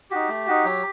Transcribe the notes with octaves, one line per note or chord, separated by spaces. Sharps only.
D#4 F#4 G4
A3
D#4 F#4
F#3